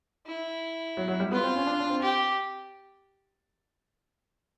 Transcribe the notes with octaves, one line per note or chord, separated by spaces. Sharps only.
E4
F#3
F#3
G3
B3 F4
C4
C#4
D4
D4
C4
G4